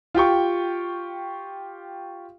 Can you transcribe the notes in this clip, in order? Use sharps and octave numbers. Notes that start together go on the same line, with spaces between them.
F4 G4 G5 C#6